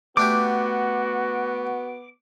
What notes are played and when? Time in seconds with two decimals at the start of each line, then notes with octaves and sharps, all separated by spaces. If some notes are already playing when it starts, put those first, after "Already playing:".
0.17 A3 B3 D4 F#4 G4 D6